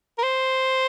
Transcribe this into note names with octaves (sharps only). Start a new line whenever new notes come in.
A#4
C5